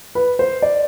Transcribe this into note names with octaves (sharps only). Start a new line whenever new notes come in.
B4
C5
D5